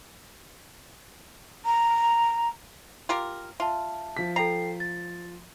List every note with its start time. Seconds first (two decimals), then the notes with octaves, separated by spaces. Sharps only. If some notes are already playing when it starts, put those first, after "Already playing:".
1.65 A#5
3.09 F4 G4 A#4
3.60 F4 E5 A5
4.17 F3 B6
4.36 A4 G5 A#5 C7
4.80 A6